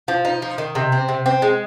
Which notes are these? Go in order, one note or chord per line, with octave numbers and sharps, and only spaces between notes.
F3
D#4
F3
D#3
C3
C4
C3
C4
G#3